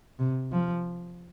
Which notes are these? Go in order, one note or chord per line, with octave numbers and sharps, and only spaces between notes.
C3
F3